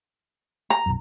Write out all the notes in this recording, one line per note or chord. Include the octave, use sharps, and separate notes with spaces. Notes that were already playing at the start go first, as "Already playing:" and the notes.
A#5
B1 F#2